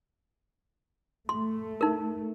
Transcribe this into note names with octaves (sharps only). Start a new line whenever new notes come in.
A3 C6
D#4 A#4